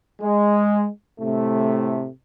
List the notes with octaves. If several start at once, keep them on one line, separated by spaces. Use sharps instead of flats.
G#3
A2 C3 A3